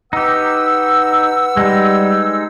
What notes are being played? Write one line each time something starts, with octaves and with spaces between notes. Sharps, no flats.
D#4 G4 B4 F#5 E6
G3 G#3 D#4